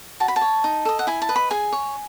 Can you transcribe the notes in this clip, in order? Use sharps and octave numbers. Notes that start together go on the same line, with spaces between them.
F#4 A5
B5
A5
C#5
D#4
A4 D#5
F#5
E4 G#5
A5
B4 D#5
B5
G#4 G#5
C#5